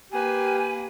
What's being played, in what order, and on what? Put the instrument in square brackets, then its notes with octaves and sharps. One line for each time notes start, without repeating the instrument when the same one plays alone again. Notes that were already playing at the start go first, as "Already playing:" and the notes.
[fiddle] A#3 B4 [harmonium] G4 [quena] G#5